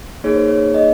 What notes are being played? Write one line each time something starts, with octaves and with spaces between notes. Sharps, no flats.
A#3 D#4 G#4 C#5
C5
C#5
D#5